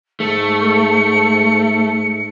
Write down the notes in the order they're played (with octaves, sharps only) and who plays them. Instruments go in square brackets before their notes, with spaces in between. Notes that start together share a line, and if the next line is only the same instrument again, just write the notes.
[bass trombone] G#2 [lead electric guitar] A3 [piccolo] C#7